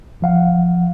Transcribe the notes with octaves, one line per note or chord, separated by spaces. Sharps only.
G1 F3 F5 F#5